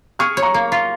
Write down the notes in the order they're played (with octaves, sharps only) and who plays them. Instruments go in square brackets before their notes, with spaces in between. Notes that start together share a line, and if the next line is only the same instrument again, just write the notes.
[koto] G#4 [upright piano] C#6 F6
[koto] C#5
[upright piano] A#5 C#6
[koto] A#3
F4